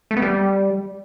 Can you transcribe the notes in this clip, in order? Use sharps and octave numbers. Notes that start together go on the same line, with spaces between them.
A3
B3
G3